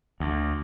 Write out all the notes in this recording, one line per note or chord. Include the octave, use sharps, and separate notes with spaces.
D2